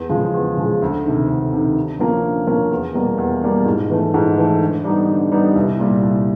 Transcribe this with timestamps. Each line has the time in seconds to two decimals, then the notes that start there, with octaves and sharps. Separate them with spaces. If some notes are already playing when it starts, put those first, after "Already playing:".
Already playing: E2
0.09 C#3 F3 G#3
0.34 E2
0.57 C#3 F3 G#3
0.82 D2
1.05 C3 D#3
1.29 D2
1.53 C3 D#3
1.76 D3
1.99 F3 A#3 C#4
2.23 D3
2.47 F3 A#3 C#4
2.71 E2
2.94 B2 G3 A#3
3.18 E2
3.42 B2 G3 A#3
3.65 G#2
3.90 E3 A3
4.14 G#2
4.37 E3 A3
4.61 D3
4.84 G3 B3 D#4
5.09 D3
5.32 G3 B3 D#4
5.56 C2
5.79 A#2 G3
6.03 C2